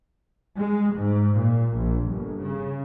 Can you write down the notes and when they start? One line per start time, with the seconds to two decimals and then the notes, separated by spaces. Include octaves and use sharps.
0.59 G#3
0.96 G#2
1.37 A#2
1.77 A#1
2.07 G1
2.45 C#3